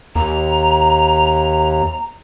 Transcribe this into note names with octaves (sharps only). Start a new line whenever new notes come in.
D#2 A#5